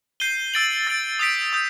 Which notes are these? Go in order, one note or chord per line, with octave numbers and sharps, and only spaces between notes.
G6 C7 D#7 G7
E6 A6 D7 F#7
E6 A6 D7 F#7
D#6 G6 B6 D7
D#6 G6